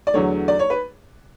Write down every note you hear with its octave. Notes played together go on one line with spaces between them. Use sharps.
D5
E2 D3 F#3 A3 C#5
D5
C#5
B4